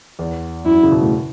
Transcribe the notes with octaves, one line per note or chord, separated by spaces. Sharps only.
E2
F#2 E4
C#3
B2
A2